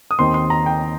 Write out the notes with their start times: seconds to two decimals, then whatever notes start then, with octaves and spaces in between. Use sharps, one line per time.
0.11 D#6
0.19 D#2 D#3 C4 C6
0.34 C6
0.50 A#5
0.66 G5